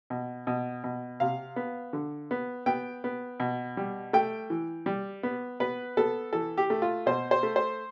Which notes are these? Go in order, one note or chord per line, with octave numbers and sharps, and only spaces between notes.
B2
B2
B2
C3 F5
B3
D3
B3
B3 G5
B3
B2
G3
A3 G5
E3
G3
B3
B3 B4
B3 A4
E3 A4
G4
A3
F4
B2 C5
C5
A3
C5